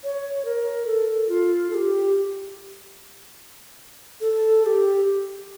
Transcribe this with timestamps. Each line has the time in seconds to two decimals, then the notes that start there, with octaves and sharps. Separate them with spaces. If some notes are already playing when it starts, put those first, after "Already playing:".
0.04 C#5
0.45 A#4
0.87 A4
1.29 F4
1.70 A4
1.74 G4
4.21 A4
4.63 A4
4.66 G4